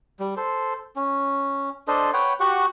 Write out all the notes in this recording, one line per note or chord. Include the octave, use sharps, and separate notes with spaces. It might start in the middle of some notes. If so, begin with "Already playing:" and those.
G3
A4 C5
C#4
D4 A4 C5 D#5
B4 C#5 F#5 G5
F#4 G4 F#5 C#6